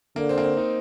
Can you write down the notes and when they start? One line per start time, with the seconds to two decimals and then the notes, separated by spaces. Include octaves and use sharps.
0.16 D3 A#3
0.29 C4
0.38 A#3
0.44 C4
0.57 D#4